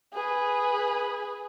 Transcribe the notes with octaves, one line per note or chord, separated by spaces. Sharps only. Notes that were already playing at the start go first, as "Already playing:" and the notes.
G#4 B4